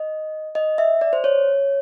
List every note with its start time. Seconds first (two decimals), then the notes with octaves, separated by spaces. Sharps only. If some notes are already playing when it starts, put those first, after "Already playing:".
Already playing: D#5
0.55 D#5
0.78 E5
1.01 D5
1.13 C5
1.24 C#5